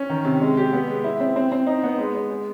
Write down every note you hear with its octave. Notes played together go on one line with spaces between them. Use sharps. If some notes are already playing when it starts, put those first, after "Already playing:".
Already playing: C#4
D#3
C3
G#3
G4
B3
G#3
E4
C4
C4
C4
D#4
B3
G#3
G#3
G#3